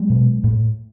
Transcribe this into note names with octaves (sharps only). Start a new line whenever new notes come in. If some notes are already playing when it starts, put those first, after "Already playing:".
Already playing: F#3 G#3
B2
A2